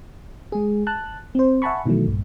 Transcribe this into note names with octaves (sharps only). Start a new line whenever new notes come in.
G#3 G#4
A5 F#6
C4 C5
E5 F#5 G#5 A5 B5 C#6
B2 D#3 E3 F#3 A3
A#1 G2 A#2